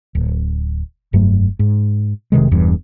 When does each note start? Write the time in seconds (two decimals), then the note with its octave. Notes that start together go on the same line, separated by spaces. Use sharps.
0.15 D1
1.13 F1 G2 F#3 A3
1.59 G#2
2.32 F1 C3 D#3 G#3
2.51 E1 E2 G2